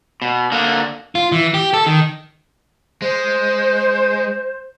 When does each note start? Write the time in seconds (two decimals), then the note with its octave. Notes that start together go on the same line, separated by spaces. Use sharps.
0.22 B2
0.52 D3 A#3
1.15 F4
1.32 E3
1.54 G4
1.73 A4
1.86 D#3
3.02 G#3 C5